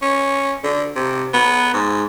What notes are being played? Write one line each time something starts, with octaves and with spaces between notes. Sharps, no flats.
C#4
D3
C3
B3
G#2